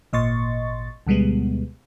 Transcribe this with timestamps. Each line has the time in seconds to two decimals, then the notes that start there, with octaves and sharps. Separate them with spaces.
0.13 G#1 A#2 D#5 C6 C#6 A6
1.07 D2 B2 G3 G#3 B3